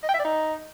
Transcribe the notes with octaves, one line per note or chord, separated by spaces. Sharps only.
D#5
G5
E5
D5
D#4